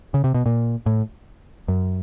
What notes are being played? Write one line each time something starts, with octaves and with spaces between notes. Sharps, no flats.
C#3
C3
B2
A#2
A2
F#2